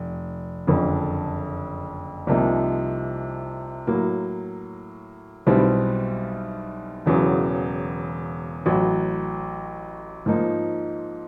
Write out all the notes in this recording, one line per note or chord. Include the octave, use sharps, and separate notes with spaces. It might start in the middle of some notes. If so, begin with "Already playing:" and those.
Already playing: F1
F#1 F2 D3
C2 C3 F3 A#3 D#4
A2 F#3 A#3
B1 B2 G3 C4 E4
E1 E2 C#3 F#3
A1 A2 F#3
G#2 F3 A#3 D#4